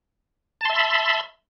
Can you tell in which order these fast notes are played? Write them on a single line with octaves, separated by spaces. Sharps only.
A5 C6 E5 B5